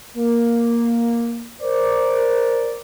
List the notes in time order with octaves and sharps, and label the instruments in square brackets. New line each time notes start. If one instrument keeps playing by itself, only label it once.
[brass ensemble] A#3
A#4 C5 D5